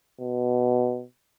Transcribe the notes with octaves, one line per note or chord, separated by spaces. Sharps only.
B2